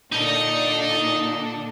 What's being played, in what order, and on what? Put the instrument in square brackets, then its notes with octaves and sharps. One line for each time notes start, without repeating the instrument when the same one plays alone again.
[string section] A#2 D3 D4 [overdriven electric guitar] D#4 D#5